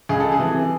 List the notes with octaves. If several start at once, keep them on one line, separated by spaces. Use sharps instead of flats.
C#2 G#4
A4
G#4
C3 E3